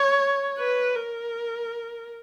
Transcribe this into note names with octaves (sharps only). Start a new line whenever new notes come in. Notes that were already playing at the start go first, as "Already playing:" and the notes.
Already playing: C#5
B4
A#4